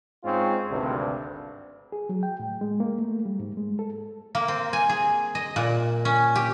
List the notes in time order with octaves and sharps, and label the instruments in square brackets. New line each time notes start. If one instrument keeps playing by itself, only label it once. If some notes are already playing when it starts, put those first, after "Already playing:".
[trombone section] G#2 G#3 C4 C#4 F4
G#1 D2 G2 C3
[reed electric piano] G#4
F#3
G5
A2
G#3
A#3
A3
G3
G#2
G#3
A4
[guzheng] A#3
C4
G#5
G#4
D#5
A#2
C#4
G4